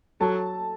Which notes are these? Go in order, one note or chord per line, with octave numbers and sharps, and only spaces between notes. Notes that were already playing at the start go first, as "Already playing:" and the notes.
F#3 A4 A5